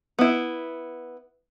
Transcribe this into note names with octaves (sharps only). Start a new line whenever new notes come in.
B3 E4